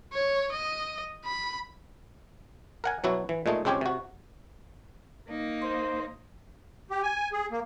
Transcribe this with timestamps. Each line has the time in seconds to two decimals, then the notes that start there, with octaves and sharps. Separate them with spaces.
0.13 C#5
0.52 D#5
1.25 B5
2.84 A#4 F#5 G#5
3.04 B2 F#3 E4 F#4
3.29 E3
3.46 A#2 G#3 A3 D#4
3.65 C#2 G#3 C4 C#4 G4 G#5
3.81 C3 F#4
5.29 A#3 D#4
5.62 C5
6.90 G4
7.03 G#5
7.32 G#4
7.51 A#3